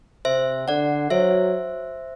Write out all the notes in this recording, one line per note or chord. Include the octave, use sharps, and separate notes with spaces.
C3 C5 E5
D3 D5 F#5
F#3 C5 E5